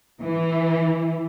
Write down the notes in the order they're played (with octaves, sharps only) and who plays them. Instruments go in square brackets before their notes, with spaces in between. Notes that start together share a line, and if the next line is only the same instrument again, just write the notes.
[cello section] E3